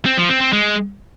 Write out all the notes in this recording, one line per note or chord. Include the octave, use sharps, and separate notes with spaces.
C4
F3
C4
C4
G#3